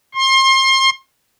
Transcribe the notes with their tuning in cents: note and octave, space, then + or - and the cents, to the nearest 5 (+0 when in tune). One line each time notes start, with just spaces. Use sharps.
C6 +30